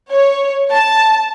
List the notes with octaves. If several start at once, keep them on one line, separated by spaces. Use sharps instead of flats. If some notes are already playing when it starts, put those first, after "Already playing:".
C#5
A5